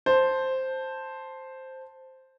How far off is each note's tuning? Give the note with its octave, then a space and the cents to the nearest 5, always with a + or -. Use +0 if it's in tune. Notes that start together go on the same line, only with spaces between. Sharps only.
C5 +0 A5 +0